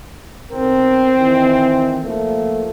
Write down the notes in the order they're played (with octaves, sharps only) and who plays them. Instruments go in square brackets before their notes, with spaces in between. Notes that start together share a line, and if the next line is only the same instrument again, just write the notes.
[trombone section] B1 A#4 [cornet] C4
[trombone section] D#3 E3
F3 A3 A#3